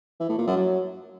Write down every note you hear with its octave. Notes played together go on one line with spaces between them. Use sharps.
E3
A2
A#2
F#2
F#3